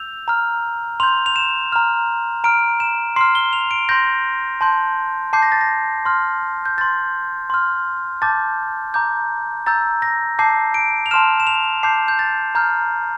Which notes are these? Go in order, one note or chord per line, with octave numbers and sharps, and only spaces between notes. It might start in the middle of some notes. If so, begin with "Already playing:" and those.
Already playing: E6 G6 F7
A#5 F6
C6 G6 F7
F7
E7
A#5 F6
A#5 F6 D7
E7
C6 F6 C7
G7
F7
D7
C6 G6 A#6
A5 C6 G6
A5 D6 G6 C7
A#6
A6
A#6
C6 F6
G6
C6 G6 A6
C6 F6
A5 D6 G6 A6
A#5 D6 G6
A#5 E6 G6 A6
A#6
A5 D6 G6 C7
D7
F7
A5 C6 F6 E7
E7
F7
A5 D6 G6 C7
G6
A6
A#5 F6 G6